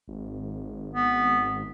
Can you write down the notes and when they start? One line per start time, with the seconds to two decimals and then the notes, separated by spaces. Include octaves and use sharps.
0.08 G#1
0.94 B3